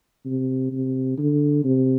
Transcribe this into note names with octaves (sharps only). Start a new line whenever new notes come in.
C3
C3
D3
C3